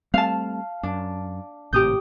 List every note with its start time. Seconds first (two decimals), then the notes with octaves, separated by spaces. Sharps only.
0.14 G3 A3 C4 F5 A5
0.83 F#2 D4
1.73 G#1 A2 C3 G4 D#6 G6